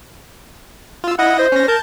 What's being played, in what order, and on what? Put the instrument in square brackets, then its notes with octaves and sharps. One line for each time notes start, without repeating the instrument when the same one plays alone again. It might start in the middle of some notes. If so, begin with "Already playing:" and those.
[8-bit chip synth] F4 E6
[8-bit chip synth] E4 D#5 A#6 [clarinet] F#5
[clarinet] C5
[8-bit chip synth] C#4 A#6
[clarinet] A#4 [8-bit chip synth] A5 G6